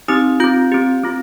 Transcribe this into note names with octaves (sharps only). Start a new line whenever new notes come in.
C4 D#4 G4 D#6
C4 F4 G6
C4 G4
C4 F4